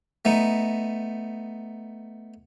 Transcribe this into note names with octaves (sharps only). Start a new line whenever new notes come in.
A3 B3 D#4